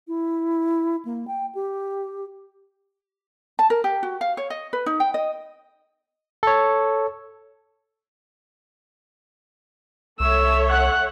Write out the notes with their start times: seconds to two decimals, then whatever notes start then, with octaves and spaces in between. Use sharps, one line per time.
0.08 E4
1.05 A#3
1.28 G5
1.55 G4
3.59 A5
3.70 A#4
3.84 G4
4.03 F#4
4.21 F5
4.37 C#5
4.50 D#5
4.73 B4
4.86 D#4
5.00 G5
5.14 D#5
6.43 A4 C#5
10.20 C2 A4 C#5 E5 E6
10.70 F#5 F#6